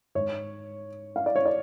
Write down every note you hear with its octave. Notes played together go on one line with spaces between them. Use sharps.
G#2 C#5
F5
D5
C#5
D5